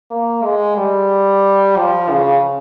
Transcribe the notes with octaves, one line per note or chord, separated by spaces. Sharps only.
A#3
G#3
G3
F3
C#3